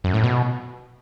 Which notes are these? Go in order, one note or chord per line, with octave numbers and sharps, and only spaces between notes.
F#2
A2
B2